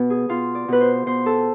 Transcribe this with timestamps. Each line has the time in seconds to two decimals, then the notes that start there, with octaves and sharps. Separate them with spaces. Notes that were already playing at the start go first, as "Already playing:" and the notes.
Already playing: B2 B4
0.10 G#4
0.29 B2 F4
0.55 D5
0.68 B2 B4
0.81 C5
1.06 B2 C5
1.26 A4